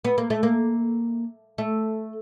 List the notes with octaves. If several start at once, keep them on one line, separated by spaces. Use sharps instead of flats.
B3
A#3
A3
A#3
A3